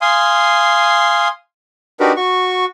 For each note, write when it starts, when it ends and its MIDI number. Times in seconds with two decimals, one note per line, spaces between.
0.01 1.28 77
0.01 1.28 80
0.01 1.28 84
0.01 1.28 87
2.00 2.12 62
2.00 2.12 63
2.00 2.12 66
2.00 2.12 67
2.00 2.12 70
2.00 2.12 71
2.17 2.65 66
2.17 2.65 85